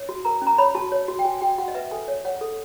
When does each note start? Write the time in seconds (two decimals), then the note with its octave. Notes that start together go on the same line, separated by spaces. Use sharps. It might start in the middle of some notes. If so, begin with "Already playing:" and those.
Already playing: C#5
0.09 F#4
0.25 A#4 A#5
0.42 C#4
0.47 A#5
0.58 C#5 B5
0.75 F#4 A5
0.92 C#5
1.08 F#4
1.19 G5
1.25 F#4 G#5
1.41 F#4 G5
1.58 F#4 F#5
1.68 D#5
1.75 B4 E5
1.91 A4 G#5
2.08 C#5
2.25 C#5 F#5
2.41 A4